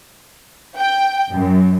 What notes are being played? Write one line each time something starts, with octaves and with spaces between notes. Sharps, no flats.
G5
F#2